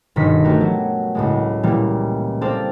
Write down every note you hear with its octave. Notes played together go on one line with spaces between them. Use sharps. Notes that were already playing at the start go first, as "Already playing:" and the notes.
G1 B2 D#3 A#6 B6
A3 B3 F#4 G4 A#4
F#3
C#2 A2 G#3
A#2 E3 G3 A#3
C4 A4 D5 F5